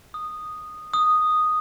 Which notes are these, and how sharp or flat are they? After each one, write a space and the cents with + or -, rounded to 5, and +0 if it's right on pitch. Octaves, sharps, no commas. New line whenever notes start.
D#6 -10
D#6 -5